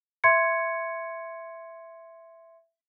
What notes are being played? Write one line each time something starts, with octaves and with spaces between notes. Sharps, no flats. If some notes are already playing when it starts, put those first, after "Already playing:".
E5 C6 G#6 C#7